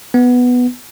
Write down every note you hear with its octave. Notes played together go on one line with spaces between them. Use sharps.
B3